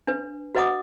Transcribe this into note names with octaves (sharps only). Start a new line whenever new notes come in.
D4 B4
F#4 B4 D#5 F#5 D6 D#6